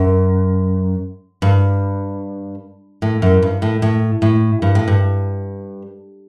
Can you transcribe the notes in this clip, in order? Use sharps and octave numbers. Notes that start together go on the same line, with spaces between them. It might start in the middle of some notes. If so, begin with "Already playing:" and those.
Already playing: F#2
G2
A2
F#2
G2
A2
A2
A2
G2
A2
G2